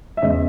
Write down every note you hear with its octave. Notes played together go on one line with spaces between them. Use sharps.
E5
E2 C#3 G#3 D#5